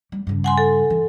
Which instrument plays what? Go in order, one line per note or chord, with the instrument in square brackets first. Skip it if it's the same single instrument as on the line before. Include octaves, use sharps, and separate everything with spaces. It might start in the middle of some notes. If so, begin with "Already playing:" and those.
[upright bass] G3
G2 C#3
[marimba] F#5 G#5 C6
A4
[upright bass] E3